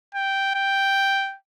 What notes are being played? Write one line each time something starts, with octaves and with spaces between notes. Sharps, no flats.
G5
G5